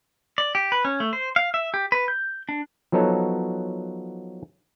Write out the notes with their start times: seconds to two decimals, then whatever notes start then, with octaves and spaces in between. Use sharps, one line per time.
0.38 D5
0.55 G4
0.72 B4
0.85 C#4
1.00 A3
1.13 C5
1.36 F5
1.54 E5
1.74 G4
1.92 B4
2.08 G6
2.49 D4
2.92 F3 F#3 B3 D#4 A4 C#5